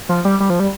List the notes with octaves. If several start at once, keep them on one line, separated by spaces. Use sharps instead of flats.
F3
G3
G3
F3
G3